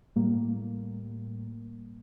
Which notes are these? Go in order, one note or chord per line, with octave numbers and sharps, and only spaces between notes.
A2 G3 A#3